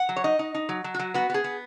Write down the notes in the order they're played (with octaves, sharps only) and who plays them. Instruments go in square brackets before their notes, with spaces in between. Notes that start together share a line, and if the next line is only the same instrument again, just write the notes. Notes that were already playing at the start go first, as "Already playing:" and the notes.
Already playing: [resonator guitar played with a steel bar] F#5
F#3
C#5
D#4 D#5
D#4
D#4
F#3
F#3
F#4
F#3
B3 F#4
B3 G#4
B3